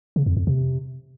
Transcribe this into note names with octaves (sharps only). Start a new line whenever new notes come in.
C#3
F2
F2
C3